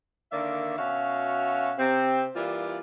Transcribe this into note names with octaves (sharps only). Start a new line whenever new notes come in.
D3 D#3 A#3 D5 E5
B2 C#4 F#4 E5 F5
C3 C4
E3 G3 A#3 F4 D5